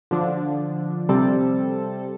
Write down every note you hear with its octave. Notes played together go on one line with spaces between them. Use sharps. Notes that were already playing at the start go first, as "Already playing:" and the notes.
D3 F3 D4
C3 G3 C4 A4